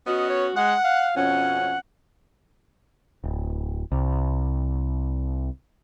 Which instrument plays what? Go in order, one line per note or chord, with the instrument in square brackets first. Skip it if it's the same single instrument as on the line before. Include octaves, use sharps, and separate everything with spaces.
[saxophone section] B3 C#4 F#4 [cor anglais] D#5
[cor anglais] C#5
[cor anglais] G#3 [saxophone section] F#5
[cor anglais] F5
[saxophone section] F2 B2 C#4 [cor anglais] F#5
[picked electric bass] D1
C2